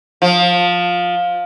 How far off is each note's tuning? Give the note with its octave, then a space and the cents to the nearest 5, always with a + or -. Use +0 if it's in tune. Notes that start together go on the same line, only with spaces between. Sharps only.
F3 +15